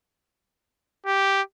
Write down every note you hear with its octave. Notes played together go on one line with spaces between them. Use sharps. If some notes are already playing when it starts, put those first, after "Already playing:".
G4